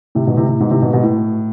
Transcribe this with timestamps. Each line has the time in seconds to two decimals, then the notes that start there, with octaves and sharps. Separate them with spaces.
0.15 A2 C3
0.27 G#2 B2
0.37 A2 C3
0.48 A2 C3
0.60 G#2 B2
0.71 A2 C3
0.82 G#2 B2
0.93 G#2 B2
1.03 A2